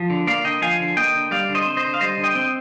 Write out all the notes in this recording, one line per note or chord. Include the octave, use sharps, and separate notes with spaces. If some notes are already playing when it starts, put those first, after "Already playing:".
Already playing: F3
D3
A#3 D5 F5
D3 D#5 G5
F3 F5 G#5
D3
A#3 D#5 G5
D3
G3 D5 F5
D3
C5 D#5
C4
C5 D#5
D3
F5
G3 C5 D#5
D3
D#5 G5
C4